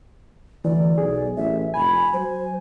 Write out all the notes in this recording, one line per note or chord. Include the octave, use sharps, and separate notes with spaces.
D2 E3 D5
B1 G#4
A1 E5
F1 G#5 B5
F#3 C5